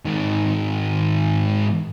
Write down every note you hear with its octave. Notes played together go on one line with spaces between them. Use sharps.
G#2 D#3